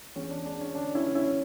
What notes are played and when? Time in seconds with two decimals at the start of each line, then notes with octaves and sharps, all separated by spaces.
0.16 E2 C#4
0.30 D4
0.45 G#3 D4
0.61 C#4
0.75 D3 D4
0.95 C#4 E4
1.05 F#1
1.15 C#4 E4